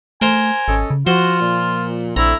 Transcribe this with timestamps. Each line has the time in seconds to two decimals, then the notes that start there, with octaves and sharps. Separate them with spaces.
0.22 A3 A#4 C5 G#5 A#5
0.68 G#1 C#4 A4 D#5
0.90 C#3
1.07 F3 F4 F#4 C5
1.41 A#2
2.16 A#1 D3 A3 C4 E4 A#5